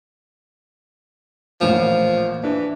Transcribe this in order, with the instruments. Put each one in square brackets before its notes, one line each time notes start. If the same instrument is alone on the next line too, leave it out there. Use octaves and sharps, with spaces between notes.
[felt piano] A1 A#2 [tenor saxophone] F3
[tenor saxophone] E3 [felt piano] D4